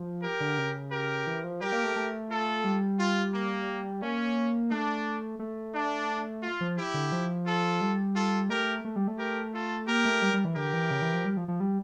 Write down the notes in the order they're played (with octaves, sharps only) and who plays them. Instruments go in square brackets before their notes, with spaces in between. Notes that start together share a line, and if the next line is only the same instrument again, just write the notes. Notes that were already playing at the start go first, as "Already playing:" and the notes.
Already playing: [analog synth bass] F3
[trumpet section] G4 A#4
[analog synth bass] D3
C#3
[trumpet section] G4 A#4
[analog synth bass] E3
F3
[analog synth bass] G3 [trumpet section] G4 A#4
[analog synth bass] A#3
A3
A3
[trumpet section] F4 A4
[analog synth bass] G3
[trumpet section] F4
A#3
[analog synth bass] A#3 [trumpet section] C#4
[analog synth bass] A3 [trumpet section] D4
[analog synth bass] A3
[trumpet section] D4
F4
[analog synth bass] F3
[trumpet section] E4 G4
[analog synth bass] D3
F3
[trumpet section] F4 A4
[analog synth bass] G3
[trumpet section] F4 A4
[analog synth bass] A3 [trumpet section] G4 A#4
[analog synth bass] A3
G3
A3
[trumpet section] G4 A#4
F4 A4
[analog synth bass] A#3 [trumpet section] G4 A#4
[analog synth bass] A3
G3
G3
E3
[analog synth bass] D3 [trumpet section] G4 A#4
[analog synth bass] E3
C#3
E3
F3
G3
F3
F3
G3